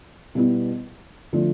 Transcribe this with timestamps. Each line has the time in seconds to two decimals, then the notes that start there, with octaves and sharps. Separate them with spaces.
0.35 B2 G3 B3 E4
1.33 D3 F3 A3